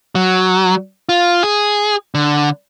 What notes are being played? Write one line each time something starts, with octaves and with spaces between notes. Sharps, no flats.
F#3
F4
G#4
D3